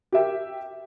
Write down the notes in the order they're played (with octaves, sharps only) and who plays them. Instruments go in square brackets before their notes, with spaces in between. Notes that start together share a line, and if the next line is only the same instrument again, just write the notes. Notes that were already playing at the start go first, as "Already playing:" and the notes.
[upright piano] G4 A#4 E5 G5